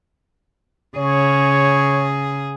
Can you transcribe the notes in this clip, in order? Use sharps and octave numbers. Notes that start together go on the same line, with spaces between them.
C#3 G#4 C#5